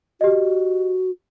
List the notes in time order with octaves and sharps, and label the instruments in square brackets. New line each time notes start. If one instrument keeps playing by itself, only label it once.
[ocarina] F#4 [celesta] G4 D#5